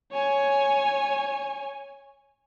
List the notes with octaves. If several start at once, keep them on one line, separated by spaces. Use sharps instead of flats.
C#5 G#5